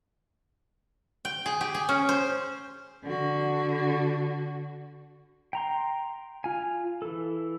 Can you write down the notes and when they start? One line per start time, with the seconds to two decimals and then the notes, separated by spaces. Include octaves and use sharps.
1.25 G5
1.46 G#4
1.61 G4
1.75 G#4
1.89 C#4
2.09 C5
3.03 D3 F#4
5.53 G5 A#5 C6
6.44 F4 G#5
7.02 E3 A4